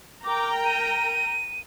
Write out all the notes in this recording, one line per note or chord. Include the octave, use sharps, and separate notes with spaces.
A#4 G5 A#5 D6
D#7